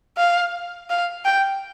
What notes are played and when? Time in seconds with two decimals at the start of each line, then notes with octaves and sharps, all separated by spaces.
0.17 F5
0.90 F5
1.25 G5